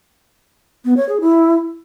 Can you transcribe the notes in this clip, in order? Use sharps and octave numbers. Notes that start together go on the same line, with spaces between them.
B3
C#5
G#4
E4